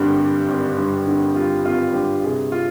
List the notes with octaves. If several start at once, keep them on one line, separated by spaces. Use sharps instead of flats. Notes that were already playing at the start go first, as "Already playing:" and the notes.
Already playing: G#1 G2 D3 G4
G3
G#1
G2
D3
G3 F4
G#1 F4
G2 G4
C3 G#4
F4